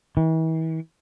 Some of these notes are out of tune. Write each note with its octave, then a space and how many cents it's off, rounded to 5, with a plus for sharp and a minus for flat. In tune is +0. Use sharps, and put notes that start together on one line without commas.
E3 -40